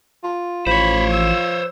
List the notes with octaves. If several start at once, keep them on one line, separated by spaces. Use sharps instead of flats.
F4
A1 F3 C5 C#5 B5
E6